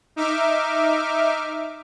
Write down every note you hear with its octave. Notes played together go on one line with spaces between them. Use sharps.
D#4 E5 D6 F6